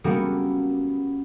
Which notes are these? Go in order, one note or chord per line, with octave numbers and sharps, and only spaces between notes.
G3 A#3 B3 C#4 F#4 A4